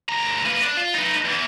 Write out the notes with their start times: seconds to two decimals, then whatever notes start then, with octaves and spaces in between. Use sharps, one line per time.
0.09 D2 A#5
0.46 A#3 B4
0.62 D4
0.77 F4
0.95 D#4 B4
1.25 E2 E3